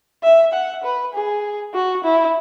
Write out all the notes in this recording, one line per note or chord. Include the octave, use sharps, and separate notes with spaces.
E5
F#5
B4
G#4
F#4
E4